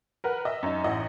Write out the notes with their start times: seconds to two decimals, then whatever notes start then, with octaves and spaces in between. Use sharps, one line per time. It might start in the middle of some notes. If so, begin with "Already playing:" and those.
0.24 A#4 B4 F#5
0.45 D#5 E5
0.63 F#2 D#4
0.84 A1 E4 D#5 F#5